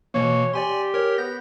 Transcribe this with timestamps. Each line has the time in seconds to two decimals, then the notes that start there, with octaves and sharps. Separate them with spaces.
0.14 B2 E3 A#3 C#5
0.53 G4 D5 G#5 C6
0.94 A#4 C#5
1.18 B3 G6 A#6